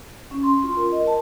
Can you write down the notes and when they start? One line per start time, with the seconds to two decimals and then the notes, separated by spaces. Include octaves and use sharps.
0.31 C#4
0.43 C6
0.64 F4
0.77 A#4
0.92 D#5
1.07 A5